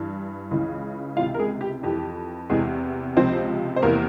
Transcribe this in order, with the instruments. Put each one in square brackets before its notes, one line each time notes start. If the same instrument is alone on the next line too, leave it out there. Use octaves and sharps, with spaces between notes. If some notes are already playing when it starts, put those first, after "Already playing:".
Already playing: [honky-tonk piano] G2 E3
C#2 C#3 E3
C#2 C3 E3 F4 F5
A#4
G#3 G#4
G4
F2 E3 G4
E2 C3 E3 G#3 G#4
C#2 C3 F3 C4 C5
C5
E2 C3 E3 A#3 A#4